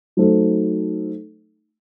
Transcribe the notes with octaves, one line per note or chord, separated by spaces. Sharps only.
F#3 A3 D#4 A4 C5